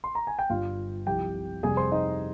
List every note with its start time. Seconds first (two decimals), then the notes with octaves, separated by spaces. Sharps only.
0.04 C6
0.15 A#5
0.27 G#5
0.39 G5
0.50 G1 G2 G3 F4 F5
1.07 C2 C3 F3 G4 G5
1.63 F2 C3 G3 G#4 G#5
1.77 C5 C6
1.92 D#4 D#5